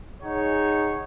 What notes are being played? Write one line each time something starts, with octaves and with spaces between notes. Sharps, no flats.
D#4 G#4 C#5 F#5